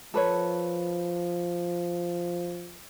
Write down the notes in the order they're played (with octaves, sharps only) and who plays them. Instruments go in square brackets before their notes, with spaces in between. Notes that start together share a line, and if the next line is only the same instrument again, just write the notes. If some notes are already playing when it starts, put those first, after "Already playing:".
[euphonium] F3 [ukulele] A4 B4 C#5